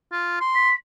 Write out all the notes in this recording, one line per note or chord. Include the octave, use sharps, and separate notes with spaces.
F4
C6
B6